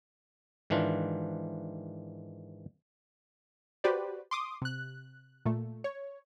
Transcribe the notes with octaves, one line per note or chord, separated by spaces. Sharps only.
G#2 D#3 E3 D4 F4
F#4 G4 B4 C5 D5
C6 D6 D#6
C3 F#6
A#2 A3
C#5